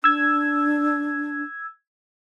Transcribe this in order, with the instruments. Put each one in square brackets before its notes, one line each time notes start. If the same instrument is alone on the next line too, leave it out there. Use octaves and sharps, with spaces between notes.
[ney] D4 [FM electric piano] E6 G#6